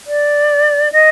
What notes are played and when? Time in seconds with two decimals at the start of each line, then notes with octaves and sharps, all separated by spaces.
0.07 D5
0.92 D#5